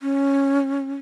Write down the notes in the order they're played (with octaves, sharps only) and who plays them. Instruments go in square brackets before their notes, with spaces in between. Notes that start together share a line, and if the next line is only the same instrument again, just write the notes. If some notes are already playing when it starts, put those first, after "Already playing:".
[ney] C#4